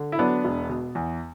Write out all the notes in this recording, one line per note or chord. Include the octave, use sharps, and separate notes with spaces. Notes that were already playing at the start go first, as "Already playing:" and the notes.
Already playing: D3
E4
F#3 B3 D4
E1
B2
E2